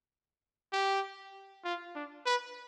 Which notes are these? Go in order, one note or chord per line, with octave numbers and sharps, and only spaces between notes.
G4
F4
D4
B4